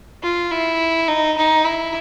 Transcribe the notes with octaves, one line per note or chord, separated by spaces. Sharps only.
F4
E4
D#4
D#4
E4